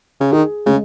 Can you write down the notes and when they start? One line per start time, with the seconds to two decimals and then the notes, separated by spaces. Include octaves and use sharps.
0.21 C#3
0.32 D#3 G#4
0.66 C#3 G#3